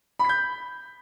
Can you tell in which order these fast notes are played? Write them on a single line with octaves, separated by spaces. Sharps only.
B5 B6 G6